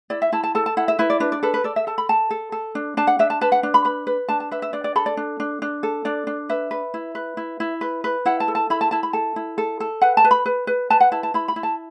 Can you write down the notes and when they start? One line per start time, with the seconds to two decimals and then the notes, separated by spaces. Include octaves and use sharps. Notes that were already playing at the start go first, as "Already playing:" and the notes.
0.10 E4 D5
0.22 E5
0.32 E4 A5
0.43 A5
0.55 A4 A5
0.66 A5
0.77 E4 F#5
0.88 E5
0.99 E4 B4
1.10 D5
1.20 D4 B4
1.32 D5
1.43 A4 B4
1.54 B4
1.64 A4 D5
1.76 E5
1.87 A4 A5
1.98 B5
2.09 A4 A5
2.31 A4
2.52 A4
2.75 D4
2.97 D4 A5
3.07 F#5
3.19 D4 E5
3.30 A5
3.41 B4 A5
3.52 F#5
3.63 D4
3.74 B5
3.85 B4 B5
4.07 B4
4.28 D4 A5
4.40 A5
4.51 B4 E5
4.62 E5
4.73 D4 D5
4.84 D5
4.96 A4 B5
5.06 D5
5.17 D4
5.40 D4
5.62 D4
5.83 A4
6.05 D4 D5
6.27 D4
6.49 B4 E5
6.71 B4
6.94 E4
7.15 B4
7.37 E4
7.60 E4
7.81 B4
8.04 B4
8.25 E4 F#5
8.40 A5
8.48 A4
8.55 A5
8.70 E4 B5
8.81 A5
8.91 E4 A5
9.03 B5
9.13 A4 A5
9.36 E4
9.58 A4
9.80 A4
10.02 B4 F#5
10.17 A5
10.24 B4
10.31 B5
10.46 B4
10.67 B4
10.90 B4 A5
11.00 F#5
11.12 E4 A5
11.23 A5
11.34 E4 B5
11.48 B5
11.56 E4
11.63 A5